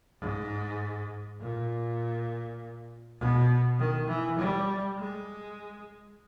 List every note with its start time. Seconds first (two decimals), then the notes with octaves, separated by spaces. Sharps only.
0.20 G#2
1.40 A#2
3.19 B2
3.78 D#3
4.08 E3
4.38 G3
4.98 G#3